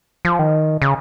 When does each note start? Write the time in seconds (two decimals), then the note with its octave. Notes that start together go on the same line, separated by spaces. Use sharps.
0.25 F3
0.39 D#3
0.82 C#3